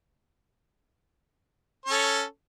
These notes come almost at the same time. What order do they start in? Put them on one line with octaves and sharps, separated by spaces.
C#5 C#4 A4